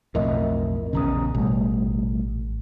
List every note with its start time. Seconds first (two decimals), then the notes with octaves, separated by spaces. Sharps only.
0.15 B1 F2 A2 A#4 D#5 E5
0.93 A#1 E2 C#3 C#4 A#5 D#6
1.35 A1 B2 G3 A3